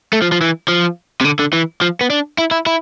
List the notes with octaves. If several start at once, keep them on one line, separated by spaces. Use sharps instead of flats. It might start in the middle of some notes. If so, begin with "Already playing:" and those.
A3
F3
F3
E3
F3
C3
D3
D3
E3
F3
B3
D4
E4
E4
E4